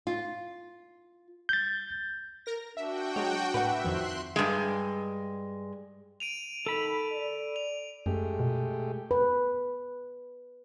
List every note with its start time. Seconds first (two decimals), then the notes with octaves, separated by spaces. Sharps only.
0.07 F4
1.49 G6 A6
2.46 A#4 A#6
2.77 D4 F#4 E5 G5
3.16 F#3 G#3 C#5
3.54 A2 B4 E5 F#5
3.84 F2 D#3 F3 C6 F#6
4.36 G2 G#3
6.20 D7 D#7 F7
6.66 D#3 A4 B5
7.12 D5
7.56 F7
8.06 F#2 G#3 A3 G4
8.39 B2
9.11 B4